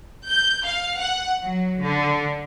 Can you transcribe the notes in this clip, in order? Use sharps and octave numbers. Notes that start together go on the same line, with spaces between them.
G6
F5
F#5
F#3
D3